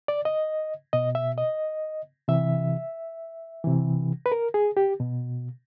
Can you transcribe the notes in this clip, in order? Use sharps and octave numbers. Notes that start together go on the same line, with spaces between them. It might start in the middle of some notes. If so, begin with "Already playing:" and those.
D5
D#5
B2 D#5
E5
D#5
C3 E3 E5
C3 E3
B4
A#4
G#4
G4
B2